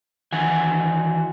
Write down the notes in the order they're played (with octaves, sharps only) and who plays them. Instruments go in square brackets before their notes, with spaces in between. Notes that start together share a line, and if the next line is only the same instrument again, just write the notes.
[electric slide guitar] D#3 E3 F#4 G#5